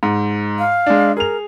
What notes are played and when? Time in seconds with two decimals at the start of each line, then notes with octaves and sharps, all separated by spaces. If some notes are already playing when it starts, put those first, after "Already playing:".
0.03 G#2
0.59 F5
0.86 G#3 D4
1.17 G#4 A#4 F7